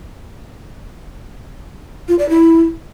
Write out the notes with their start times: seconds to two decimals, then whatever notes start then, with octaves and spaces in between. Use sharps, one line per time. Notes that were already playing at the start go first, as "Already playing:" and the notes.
2.08 F4
2.19 D5
2.29 E4